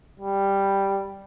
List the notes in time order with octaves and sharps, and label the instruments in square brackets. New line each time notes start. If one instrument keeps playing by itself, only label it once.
[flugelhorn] G3